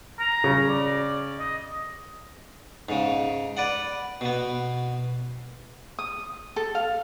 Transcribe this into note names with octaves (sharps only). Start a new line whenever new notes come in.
A#5
C#3
D5
D#5
G#2 C#3
B4 D5 F#5
B2 B3
D#6
A4
F5